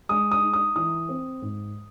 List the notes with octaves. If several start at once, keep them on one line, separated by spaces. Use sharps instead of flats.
G#3 D#6
D#6
D#4
D#6
E3 D#6
C4
G#2